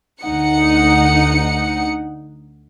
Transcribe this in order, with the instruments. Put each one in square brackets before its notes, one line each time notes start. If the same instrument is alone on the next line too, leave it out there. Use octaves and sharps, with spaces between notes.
[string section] D2 D#4 F#5 C#7